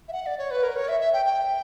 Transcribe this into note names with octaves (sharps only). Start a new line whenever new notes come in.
E5
F#5
D5
C#5
B4
A#4
C#5
E5
E5
G5
G5